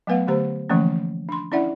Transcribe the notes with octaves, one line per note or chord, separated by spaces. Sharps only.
F#3 A3 B3 B4 F5 F#5
D3 A3 G4 C5 A#5
D3 E3 F3 A3 A#3 C#4
D4 C6
C#4 D4 E4 D5 E5 F#5